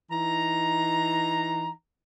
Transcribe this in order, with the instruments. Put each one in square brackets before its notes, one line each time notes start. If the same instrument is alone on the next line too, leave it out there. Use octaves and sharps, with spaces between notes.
[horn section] E3 D#4 A#5